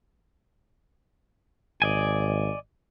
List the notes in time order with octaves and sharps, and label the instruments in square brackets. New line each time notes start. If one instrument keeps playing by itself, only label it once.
[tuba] G#1 [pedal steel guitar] D5 D#5 G#5